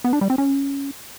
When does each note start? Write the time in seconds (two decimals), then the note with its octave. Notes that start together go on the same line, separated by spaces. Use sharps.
0.04 B3
0.13 D4
0.21 G3
0.30 C4
0.38 C#4